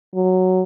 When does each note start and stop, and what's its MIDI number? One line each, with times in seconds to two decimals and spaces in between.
0.14 0.63 54